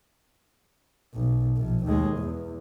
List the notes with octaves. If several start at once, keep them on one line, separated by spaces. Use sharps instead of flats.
B1
A#1
D#2 G#3
E2